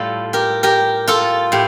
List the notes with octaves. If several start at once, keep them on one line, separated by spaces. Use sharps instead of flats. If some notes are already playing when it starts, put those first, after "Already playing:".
Already playing: A2 G3 F4 A4
G4 A#4
G4 A#4
F4 A4
A2 G4